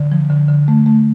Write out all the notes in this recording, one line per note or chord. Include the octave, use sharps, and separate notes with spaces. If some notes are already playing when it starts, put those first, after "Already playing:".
Already playing: D3
F3
D3
D3
A3
A3